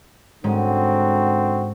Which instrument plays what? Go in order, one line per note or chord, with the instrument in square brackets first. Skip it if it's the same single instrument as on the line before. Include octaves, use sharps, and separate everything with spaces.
[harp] G#2 G#3 C#4 [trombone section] D3 C4 F#4